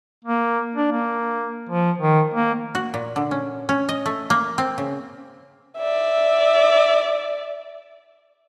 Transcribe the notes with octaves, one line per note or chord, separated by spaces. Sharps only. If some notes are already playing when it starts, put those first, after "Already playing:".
A#3
D4
A#3
F3
D#3
A#3
F#4
A#2
D3
C#4
C#4
D#5
A3
A#3
C4
C#3
D5 E5